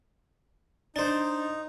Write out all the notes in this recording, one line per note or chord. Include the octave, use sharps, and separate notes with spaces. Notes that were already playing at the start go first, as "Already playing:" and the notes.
D4 D#4 C5